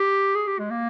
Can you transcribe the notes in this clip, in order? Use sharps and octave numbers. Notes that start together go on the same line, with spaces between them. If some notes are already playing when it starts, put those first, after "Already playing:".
Already playing: G4
G#4
G4
G#3
A#3